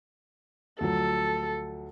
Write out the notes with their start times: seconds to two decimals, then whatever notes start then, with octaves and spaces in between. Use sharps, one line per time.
0.80 D2 F3 F#3 A4